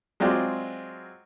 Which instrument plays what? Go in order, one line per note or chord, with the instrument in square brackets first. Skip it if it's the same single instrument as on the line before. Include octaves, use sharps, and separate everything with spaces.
[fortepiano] F#3 G#3 C4 F4 D5